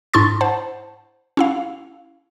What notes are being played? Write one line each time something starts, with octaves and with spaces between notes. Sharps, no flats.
G#2 D4 E4 C6 C#6 A6
C5 F#5 A5
C#4 E4 F5